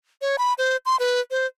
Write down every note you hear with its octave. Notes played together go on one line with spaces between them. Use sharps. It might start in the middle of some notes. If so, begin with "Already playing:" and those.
C#5
B5
C5
C6
B4
C5